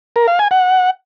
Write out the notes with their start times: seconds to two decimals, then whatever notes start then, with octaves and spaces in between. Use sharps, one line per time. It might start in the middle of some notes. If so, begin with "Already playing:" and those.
0.16 A#4
0.27 F5
0.39 G#5
0.51 F#5